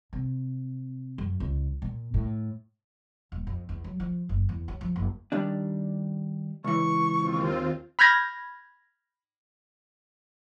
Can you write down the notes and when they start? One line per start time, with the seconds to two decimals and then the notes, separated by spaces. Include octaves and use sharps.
0.13 C3
1.18 F#2
1.40 C#2
1.82 A#2
2.14 A2
3.32 D#1
3.47 F2
3.69 E2
3.84 F#3
4.00 F3
4.29 F#1
4.49 E2
4.68 C#4
4.81 F3
4.96 F#1
5.32 D#3 G3 D4
6.64 C#2 E3 C#6
7.19 D#2 C4 F4
7.99 B5 F6 G6 G#6 A#6